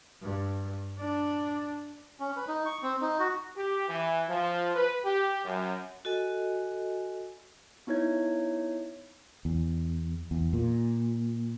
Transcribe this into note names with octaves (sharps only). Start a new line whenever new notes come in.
G2
D4
C#4
B4
D#4
C#6
C4
D#4
F#4
G4
E3
F3
B4
G4
F#2
F#4 A4 D#5 G#5
B3 D#4 E4 C#5 G#6
E2
E2
A#2